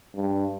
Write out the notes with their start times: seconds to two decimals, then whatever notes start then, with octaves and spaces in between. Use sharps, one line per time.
0.16 G2